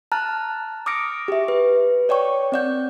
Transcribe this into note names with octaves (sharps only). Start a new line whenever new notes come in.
A5 A#5 F6 F#6 A6
D6 D#6 F6 A#6 C#7 D7
G4 E5
B4
C#5 D5 G5 C#6
C4 D5 G6